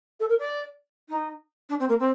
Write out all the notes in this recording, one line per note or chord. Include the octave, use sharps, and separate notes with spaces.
A4
A#4
D5
D#4
D4
C4
A#3
C4